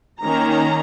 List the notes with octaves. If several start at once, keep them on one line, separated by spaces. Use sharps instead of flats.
D#3 A#3 C#4 A#5